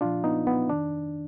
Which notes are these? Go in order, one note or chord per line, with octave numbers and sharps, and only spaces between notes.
A#2 F3 D4 F4
B3 D#4
B3
F2 D#3 D4